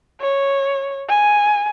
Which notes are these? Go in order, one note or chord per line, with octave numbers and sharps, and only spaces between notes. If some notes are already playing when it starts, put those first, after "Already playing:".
C#5
G#5